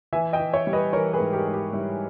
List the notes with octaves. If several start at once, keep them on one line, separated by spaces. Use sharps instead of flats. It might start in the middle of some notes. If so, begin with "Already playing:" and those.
E3 E5 G#5
D#5 G5
E3
C#5 E5
G3
B4 D#5
E3 A#4 C#5
G#4 B4
G#2
G4 A#4
G#2
G4
G3 E4